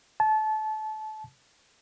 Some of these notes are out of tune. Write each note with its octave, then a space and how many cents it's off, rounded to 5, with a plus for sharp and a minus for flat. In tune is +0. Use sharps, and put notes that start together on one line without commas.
A5 -25